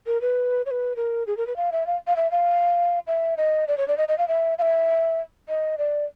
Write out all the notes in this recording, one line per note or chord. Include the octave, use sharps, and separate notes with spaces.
A#4
B4
C#5
B4
A#4
G#4
A#4
B4
F5
E5
F5
F5
E5
F5
E5
D#5
D5
C#5
D5
D#5
D#5
F5
E5
F5
E5
D#5
D5